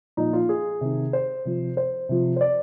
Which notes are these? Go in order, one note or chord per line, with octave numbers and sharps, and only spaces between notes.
A#2 F3 D#4
F4
G#4
C3 D#3
C5
C3 F3
C5
C3 F3
C5
D5